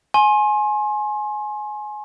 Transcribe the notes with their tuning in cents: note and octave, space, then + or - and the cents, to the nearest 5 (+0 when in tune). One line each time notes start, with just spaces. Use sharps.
G#5 +20 C6 +35